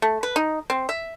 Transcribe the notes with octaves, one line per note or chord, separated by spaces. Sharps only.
A3
B4
D#4
C4
E5